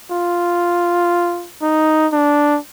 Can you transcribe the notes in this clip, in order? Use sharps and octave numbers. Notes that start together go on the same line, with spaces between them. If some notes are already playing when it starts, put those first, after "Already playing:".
F4
D#4
D4